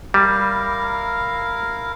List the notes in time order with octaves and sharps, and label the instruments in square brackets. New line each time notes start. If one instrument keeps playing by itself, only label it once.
[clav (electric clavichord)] G3 [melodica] E4 A#4 F5